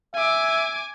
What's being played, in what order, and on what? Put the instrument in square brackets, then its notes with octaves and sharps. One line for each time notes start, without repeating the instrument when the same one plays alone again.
[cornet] E5 [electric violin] G#5 D6